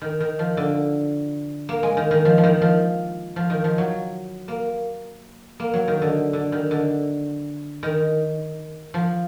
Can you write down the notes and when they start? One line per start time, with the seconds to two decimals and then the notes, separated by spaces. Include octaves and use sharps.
0.02 D#3
0.20 D#3
0.39 F3
0.57 D3
1.69 A#3
1.83 G#3
1.97 D#3
2.11 D#3
2.25 F3
2.38 F3
2.44 D#3
2.62 F3
3.36 F3
3.50 D#3
3.64 F3
3.78 F#3
4.48 A#3
5.60 A#3
5.74 F#3
5.88 D#3
6.02 D3
6.33 D3
6.52 D#3
6.71 D3
7.83 D#3
8.94 F3